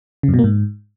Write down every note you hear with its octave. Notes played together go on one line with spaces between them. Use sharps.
C#3
F#2
B2
A#3
G#2